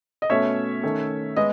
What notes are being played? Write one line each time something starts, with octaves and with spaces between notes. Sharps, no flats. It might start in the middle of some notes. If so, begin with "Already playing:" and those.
D#5
B2 A3 C#4 C#5 E5
D#3 A3 C#4
G#3 B3 D#5